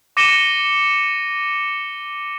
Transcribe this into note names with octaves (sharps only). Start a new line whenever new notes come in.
D6 A#6 C#7 D#7 E7 G7